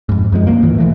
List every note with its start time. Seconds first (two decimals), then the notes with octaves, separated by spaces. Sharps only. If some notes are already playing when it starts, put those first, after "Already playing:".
0.09 F2 G#2
0.32 F#2 F3 G#3
0.47 D2 G2 F#3 A#3
0.62 D#2 A2 E3
0.78 B1 E3 A3